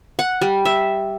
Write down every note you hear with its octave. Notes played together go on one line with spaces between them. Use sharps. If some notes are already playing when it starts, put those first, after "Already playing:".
F#5
G3
E5